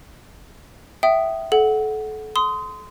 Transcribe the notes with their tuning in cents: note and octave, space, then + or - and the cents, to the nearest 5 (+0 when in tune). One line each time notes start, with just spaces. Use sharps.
E5 +0 G5 -30 D#6 -10
A4 -30 F#5 +0
C6 -25 D#6 +15